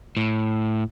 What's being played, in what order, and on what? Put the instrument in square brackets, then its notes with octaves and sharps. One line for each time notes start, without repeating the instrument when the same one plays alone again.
[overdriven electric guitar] A2